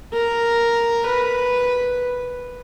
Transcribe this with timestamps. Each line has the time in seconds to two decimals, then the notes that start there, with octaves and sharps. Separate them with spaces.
0.13 A#4
1.06 B4